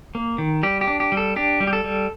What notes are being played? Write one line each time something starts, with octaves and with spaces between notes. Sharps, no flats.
A#3
D#3
G3 G4
G4
D4
G4
G3
A4
D4 G4
G3
G4
A4
G3